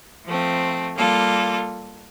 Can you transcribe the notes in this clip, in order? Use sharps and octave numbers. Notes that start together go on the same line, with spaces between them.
F3 A3 C4
G3 A#3 F4 A4